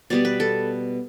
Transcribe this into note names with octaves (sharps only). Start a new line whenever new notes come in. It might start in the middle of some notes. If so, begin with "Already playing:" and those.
B2 G3 B3 D5
B4
A4